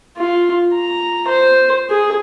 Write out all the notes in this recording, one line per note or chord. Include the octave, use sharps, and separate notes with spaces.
F4
A#5
C5
G#4